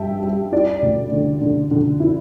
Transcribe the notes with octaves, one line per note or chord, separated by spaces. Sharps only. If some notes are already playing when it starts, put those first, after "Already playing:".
Already playing: G2 G3 E5 G5 A5
G3
E4 D5
D2
D3
D3
D3
E4